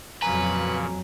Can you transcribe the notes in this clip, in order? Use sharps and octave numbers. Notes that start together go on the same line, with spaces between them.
F2 A#2 C#3 F#3 B4 G#5 A#5